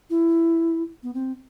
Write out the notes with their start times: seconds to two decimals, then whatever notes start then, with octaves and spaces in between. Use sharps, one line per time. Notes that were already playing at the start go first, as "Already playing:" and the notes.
0.10 E4
1.03 B3
1.14 C4